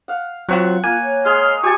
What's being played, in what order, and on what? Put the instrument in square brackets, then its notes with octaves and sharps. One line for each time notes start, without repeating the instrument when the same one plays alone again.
[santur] F5 F#5
[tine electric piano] F#3 C4 F4 [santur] F#5 C#6
[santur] A#3 [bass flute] F4 [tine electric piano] G#5
[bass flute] C#5
[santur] G#3 G#4 [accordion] C6 F6
[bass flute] F#4 [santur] G4 A5 [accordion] G#5 C#6